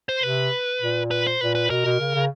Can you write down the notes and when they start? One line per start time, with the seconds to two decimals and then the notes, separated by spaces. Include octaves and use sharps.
0.09 C5
0.23 C3 B4
0.82 A#2
1.11 B4
1.27 C5
1.41 A#2 B4
1.55 B4
1.70 B2 A#4
1.86 B2
2.00 C#3
2.15 C#3